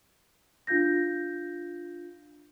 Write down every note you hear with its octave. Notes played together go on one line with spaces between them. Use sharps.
D4 F4 F5 G6 A#6